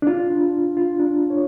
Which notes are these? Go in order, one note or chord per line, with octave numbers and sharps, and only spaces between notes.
D4
F4
D4
F4
D4
C#5